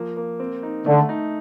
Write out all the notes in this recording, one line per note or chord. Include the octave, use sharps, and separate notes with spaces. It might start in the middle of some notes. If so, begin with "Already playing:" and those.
Already playing: F3 A#3
A#3
C4
D#4
D3 A3
D#4